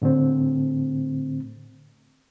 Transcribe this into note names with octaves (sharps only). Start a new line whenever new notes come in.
A2 D3 A3 C4